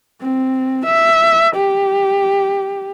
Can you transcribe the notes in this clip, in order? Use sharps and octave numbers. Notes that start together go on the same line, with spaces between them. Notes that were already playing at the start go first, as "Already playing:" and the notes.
C4
E5
G4